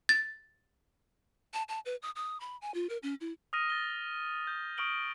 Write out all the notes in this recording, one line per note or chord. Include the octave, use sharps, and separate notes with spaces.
A6
A5
A5
B4
D#6
D#6
B5
G#5
F4
A#4
C#4
E4
D#6 F6 A#6 D#7
A6 G7
G6
C#6 D#6 F6 D7 F#7 G7